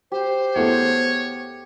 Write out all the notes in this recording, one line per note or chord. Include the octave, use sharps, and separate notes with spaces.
G4 C5
E2 A3 C#5